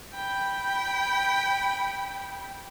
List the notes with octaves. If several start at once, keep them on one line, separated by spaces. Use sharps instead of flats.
G5 B5